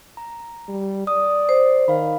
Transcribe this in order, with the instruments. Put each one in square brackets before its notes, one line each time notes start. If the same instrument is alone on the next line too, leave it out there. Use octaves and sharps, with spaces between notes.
[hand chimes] A#5
[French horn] G3
[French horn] D5 [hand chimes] D#6
[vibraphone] C5
[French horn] D#3 [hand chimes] F5 B5